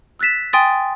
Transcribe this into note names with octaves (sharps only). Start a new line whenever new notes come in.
E6 F#6 A6 B6 E7
G5 G#5 C6 D#6 A6